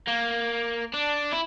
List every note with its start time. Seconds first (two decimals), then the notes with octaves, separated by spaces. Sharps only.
0.08 A#3
0.94 D4
1.32 E4